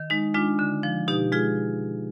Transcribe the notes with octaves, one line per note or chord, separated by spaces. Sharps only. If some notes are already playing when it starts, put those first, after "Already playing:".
Already playing: D#3
G#3 D#4
G#3 D4 F4
D3
F3
B2 D#4 G4
G#3 F4 G#4